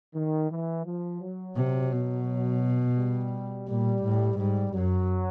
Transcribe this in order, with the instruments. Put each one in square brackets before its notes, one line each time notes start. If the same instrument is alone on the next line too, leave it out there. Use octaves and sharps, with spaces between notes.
[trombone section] D#3
E3
F3
F#3
[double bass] C3
B2
[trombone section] G3
[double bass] A#2 [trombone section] G3
[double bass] A2
[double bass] G#2 [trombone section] G3
[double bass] F#2 [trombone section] F#3